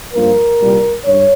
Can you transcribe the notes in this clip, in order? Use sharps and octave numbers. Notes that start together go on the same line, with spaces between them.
G2 F3 A#3 A#4
C2 A#2 G3
G2 C#5